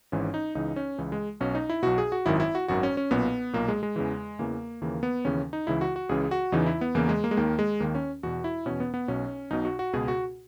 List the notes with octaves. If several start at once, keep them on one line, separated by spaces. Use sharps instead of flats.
G#1 G#2 E3 C#4
D#4
C#2 C#3 E3 D#4
C#4
C#2 C#3 E3
G#3
B1 B2 C#4
D#4
E4
B1 B2 F#4
G#4
F#4
G#1 F#2 D#3 E4
E4
F#4
G#1 F#2 D#3 F#4
C#4
C#4
B1 A#2 B3
B1 A#2 A#3
G#3
G#3
E2 C#3 E3
E2 C#3 E3 A#3
D#2 C#3 E3 A#3
B3
D#2 C#3 E3 C#4
D#4
C#2 C#3 E3 E4
F#4
F#4
C#2 C#3 E3 G#4
F#4
E2 C#3 E3 D#4
E4
B3
E2 C#3 E3 A#3
G#3
A#3
G#3
D#2 D#3 A#3
G#3
D#2 D#3 A#3
C#4
E2 B2 F#4
E4
E2 B2 C#4
B3
B3
B1 B2 C#4
B1 B2 D#4
F#4
F#4
C#2 B2 G#4
F#4